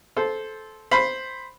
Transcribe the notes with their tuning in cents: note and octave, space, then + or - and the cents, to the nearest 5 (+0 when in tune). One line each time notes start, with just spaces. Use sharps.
A4 -15 C5 +0
C5 +0 B5 +5